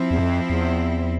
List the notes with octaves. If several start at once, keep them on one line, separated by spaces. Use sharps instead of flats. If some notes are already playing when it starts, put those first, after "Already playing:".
Already playing: F3 C4 E4
E2
F2
E2